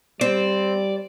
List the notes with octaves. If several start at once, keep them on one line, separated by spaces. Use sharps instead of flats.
G3 C4 D5